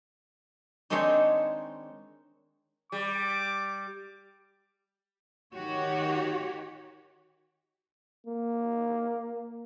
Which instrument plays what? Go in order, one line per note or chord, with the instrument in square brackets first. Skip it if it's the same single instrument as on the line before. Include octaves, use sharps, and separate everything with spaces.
[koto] D#3 G#3 C4 D4 D#4 C#5
[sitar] G3 [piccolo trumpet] D6
[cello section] D#3 F#4 G4 C#5
[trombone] A#3